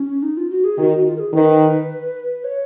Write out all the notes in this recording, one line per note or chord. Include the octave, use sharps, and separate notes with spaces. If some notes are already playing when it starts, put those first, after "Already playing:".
Already playing: C#4
D#4
F4
F#4
G#4
D#3 F#4
F#4
F4
A#4
G#4
D#3 B4
C#5